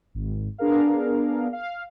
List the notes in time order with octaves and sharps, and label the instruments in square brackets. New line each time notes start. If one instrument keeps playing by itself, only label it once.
[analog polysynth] G#1
B3 D4 G#4 A#4 F5
F5